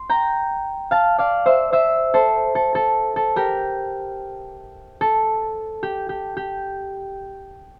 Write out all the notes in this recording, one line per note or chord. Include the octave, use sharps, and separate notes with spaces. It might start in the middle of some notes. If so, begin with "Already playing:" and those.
Already playing: C6
G5 A#5
F5 A5
D5 F5
C5 E5
C5 E5
A4 C5
A4
A4
A4
G4 A#4
A4
G4
G4
G4